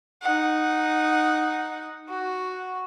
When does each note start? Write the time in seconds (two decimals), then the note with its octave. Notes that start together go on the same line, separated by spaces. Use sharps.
0.23 D#4 F#5
2.09 F#4